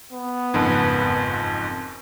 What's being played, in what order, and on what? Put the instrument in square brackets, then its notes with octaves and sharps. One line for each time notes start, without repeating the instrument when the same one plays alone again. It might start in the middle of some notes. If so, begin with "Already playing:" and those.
[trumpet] B3
[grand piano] F#1 F2 G#2